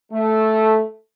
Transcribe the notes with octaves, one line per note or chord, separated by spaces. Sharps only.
A3